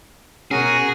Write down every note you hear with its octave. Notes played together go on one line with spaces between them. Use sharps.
B2 C#4 F#4 G#4 A#4